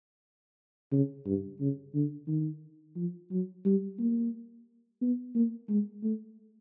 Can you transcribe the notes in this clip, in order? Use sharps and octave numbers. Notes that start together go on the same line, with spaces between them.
C#3
G2
C#3
D3
D#3
F3
F#3
G3
A#3
B3
A#3
G#3
A3